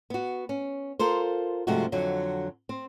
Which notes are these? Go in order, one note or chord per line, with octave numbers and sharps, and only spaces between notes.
B3 F#4
C#4
F4 A4 A#4 C5
G2 C3 F3 G#3 A3 F#4
F2 D3 F#3
C4